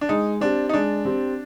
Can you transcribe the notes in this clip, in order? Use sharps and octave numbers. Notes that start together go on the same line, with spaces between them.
D4
G#3 D#4
C4 D4 G4
D#4
G#3 D4
C4 G4